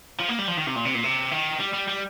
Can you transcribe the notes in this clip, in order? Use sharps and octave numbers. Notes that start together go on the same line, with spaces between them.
F3
A#3
G3
F3
D#3
C3
A#2
C3
A#2
C3
D#3
G3
G3
G3